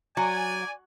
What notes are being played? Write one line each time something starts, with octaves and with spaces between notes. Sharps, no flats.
F#3 D5 G#5